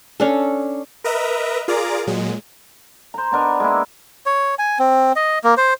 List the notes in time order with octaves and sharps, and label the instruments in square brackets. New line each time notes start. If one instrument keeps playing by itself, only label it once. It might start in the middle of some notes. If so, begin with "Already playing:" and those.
[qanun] C#4 D4 A4
[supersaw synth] A#4 B4 D#5 E5 A#5
F4 G#4 A#4 D5 A#5 D6
A#2 F#3 G#3
[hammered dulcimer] C5 A#5
B3 D4 A#4 D#5
G#3 A#3 E4
[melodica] C#5
G#5
C4
D#5
A#3
C5